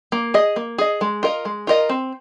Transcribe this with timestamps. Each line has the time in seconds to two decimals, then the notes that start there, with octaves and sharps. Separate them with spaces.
0.12 A#3
0.34 G#4 D#5
0.56 A#3
0.78 G#4 D#5
1.01 G#3
1.23 F4 A#4 D#5
1.45 G#3
1.67 F4 A#4 D#5
1.89 C4